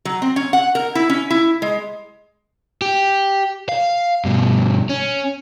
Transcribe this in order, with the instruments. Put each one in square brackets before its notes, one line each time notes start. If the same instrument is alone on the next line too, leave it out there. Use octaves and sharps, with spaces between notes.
[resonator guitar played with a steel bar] F#3
C4
C#4
F#5
A#4
E4
C#4
E4
G#3
[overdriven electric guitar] G4
F5
G2 B2
C#4